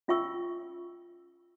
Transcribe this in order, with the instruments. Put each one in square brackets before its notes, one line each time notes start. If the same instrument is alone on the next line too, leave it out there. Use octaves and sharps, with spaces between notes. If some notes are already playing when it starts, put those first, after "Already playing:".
[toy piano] C#4 F4 E5 G5 C#6 E6